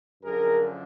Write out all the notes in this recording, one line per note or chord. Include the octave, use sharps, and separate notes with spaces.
F#2 D3 F3 G#4 A#4